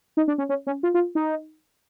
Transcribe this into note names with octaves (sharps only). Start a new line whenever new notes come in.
D#4
D4
C#4
C#4
C#4
F4
F4
D#4